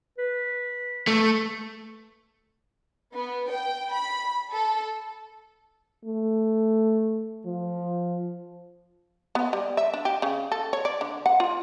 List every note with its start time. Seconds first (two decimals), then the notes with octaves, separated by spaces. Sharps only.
0.18 B4
1.07 A3
3.14 B3
3.51 G5
3.93 B5
4.52 A4
6.05 A3
7.45 F3
9.35 B3
9.53 G3
9.77 E5
9.94 D4
10.05 G4
10.22 C#3
10.52 A4
10.73 C#5
10.85 D5
11.01 D3
11.26 F#5
11.40 F4